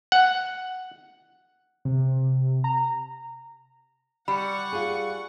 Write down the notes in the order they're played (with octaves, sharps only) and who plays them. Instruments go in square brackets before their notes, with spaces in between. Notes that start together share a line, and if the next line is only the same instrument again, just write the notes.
[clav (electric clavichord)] F#5
[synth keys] C3
A#5
[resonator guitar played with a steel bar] G3 [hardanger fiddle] F#5 C#6 [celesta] B5
[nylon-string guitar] F4 G#4